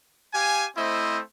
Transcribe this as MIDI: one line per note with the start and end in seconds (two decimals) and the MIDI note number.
0.34 0.66 67
0.34 0.66 77
0.34 0.66 80
0.76 1.19 57
0.76 1.19 60
0.76 1.19 64
0.76 1.19 72
0.76 1.19 75